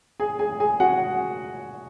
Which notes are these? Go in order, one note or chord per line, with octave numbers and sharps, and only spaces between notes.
G#4 G#5
G#4 G#5
G#4 G#5
F#4 F#5